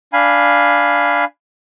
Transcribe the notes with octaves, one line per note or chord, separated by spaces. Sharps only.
D4 F5 G#5 B5